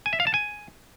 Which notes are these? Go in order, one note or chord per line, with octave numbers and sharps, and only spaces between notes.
G#5
E5
F5
A5
G#5